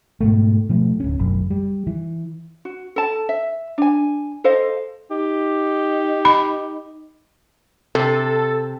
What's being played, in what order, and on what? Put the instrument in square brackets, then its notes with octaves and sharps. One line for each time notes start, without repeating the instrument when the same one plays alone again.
[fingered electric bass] G#2 B2 A3
B2 F3 A3
D1 C#4
F#1 B1 F#2
G3
E3
[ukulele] F#4
A4 A5
E5
D4 G#5
A4 C5 D#5 F5
[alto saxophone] D#4 [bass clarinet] G4
[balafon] B5
[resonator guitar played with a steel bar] C3 [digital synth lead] A4